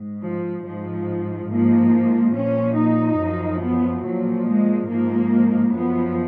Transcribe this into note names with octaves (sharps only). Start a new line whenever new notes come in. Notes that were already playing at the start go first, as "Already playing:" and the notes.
Already playing: G#2
F3
G#2 F3
G#2 F3 A#3
A#2 F3 C#4
D#4
F#2 F3
B3
A#2 F3 F#3
G#3
G#2 F3 A#3
F#2 F3 B3